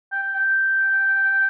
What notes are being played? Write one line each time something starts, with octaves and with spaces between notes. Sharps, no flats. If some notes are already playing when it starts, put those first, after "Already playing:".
G5
G5